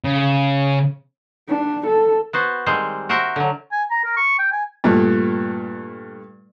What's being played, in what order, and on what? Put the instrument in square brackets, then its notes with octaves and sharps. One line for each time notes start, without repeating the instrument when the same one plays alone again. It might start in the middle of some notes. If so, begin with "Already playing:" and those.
[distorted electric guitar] C#3
[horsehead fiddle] D4
A4
[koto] B3 F#4 C5
D#3 G3 G#3 C4 C5
F#4 A#4 C5 E5 F#5
D3 F#3
[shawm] G#5
A#5
A#4
C#6
G5
G#5
[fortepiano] G2 A#2 A3